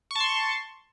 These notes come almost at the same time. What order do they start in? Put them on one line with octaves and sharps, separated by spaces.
C#6 A5 C6